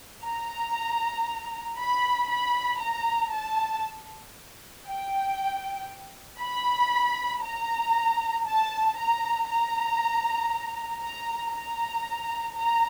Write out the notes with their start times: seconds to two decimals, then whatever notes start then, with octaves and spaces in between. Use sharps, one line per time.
0.25 A#5
1.80 B5
2.31 B5
2.82 A#5
3.33 A5
4.87 G5
6.41 B5
7.44 A#5
8.47 A5
8.99 A#5
9.49 A#5
11.03 A#5
11.55 A#5
12.58 A#5